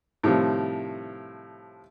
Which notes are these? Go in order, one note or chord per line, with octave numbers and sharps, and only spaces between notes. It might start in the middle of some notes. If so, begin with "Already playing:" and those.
A2 C3 D#3 F3 G3